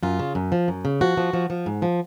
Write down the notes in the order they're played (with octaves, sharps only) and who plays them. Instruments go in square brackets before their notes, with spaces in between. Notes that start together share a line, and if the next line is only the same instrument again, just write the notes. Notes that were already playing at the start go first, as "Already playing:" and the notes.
[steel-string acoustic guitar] F#2 F4
C#3
F#2
F3
F#2
C#3
F3 F#4
F3
F3
F3
G#2
F3